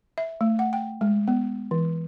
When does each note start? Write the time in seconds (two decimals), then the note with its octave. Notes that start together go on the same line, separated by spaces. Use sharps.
0.18 E5
0.41 A3
0.59 F#5
0.73 G5
1.01 G#3
1.28 B3
1.71 E3